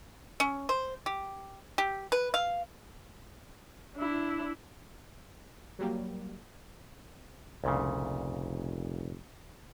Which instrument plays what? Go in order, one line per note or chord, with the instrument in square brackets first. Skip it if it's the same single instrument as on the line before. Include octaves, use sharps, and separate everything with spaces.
[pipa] C#4
C5
G4
G4
B4
F5
[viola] D4 E4
[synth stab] F#3 G3 A#3
[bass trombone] F1 [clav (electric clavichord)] C2 A#2 C#3